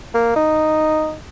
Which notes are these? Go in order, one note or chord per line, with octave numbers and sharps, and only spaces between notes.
A#3
D#4